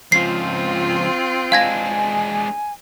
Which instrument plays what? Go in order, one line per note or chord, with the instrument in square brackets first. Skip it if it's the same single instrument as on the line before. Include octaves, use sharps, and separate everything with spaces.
[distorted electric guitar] C#2 F3 [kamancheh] C4 F4 [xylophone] C7
[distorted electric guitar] G#3 D4 [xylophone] F5 G#6 A#6 [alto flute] G#5